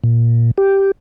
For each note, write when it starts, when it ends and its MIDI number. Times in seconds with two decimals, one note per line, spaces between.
0.04 0.51 46
0.58 0.91 67